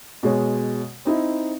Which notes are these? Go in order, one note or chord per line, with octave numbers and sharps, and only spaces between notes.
B2 G#3 C#5
C4 D#4 E4